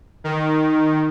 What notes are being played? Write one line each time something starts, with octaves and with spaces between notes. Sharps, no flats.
D#3